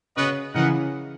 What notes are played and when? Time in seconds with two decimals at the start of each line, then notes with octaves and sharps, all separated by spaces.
0.17 C#3 B3 F#4 B4 D#5 F#5
0.55 C#3 E3 D#4 A#4 D#5 F#5